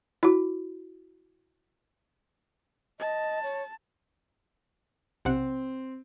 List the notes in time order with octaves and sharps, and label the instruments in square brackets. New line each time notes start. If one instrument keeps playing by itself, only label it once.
[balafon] E4 F#4
[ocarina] D#5 [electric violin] A5
[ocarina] C#5
[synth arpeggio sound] B1 C3 F#5 [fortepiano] C4